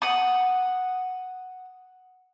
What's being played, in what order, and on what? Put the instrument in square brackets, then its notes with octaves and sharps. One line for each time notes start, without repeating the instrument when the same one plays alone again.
[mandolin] F#5 D#6